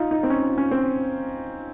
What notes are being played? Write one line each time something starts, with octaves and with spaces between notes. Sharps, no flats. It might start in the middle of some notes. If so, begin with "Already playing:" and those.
Already playing: D#4 F4
D#4
C4
C#4
C#4
C4